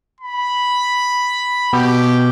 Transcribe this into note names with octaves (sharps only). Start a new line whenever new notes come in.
B5
B2 G4